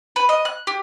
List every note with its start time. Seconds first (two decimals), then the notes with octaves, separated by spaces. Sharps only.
0.16 B4
0.29 D#5
0.45 F#6
0.67 G4